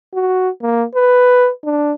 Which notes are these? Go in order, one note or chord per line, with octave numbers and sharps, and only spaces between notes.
F#4
A#3
B4
D4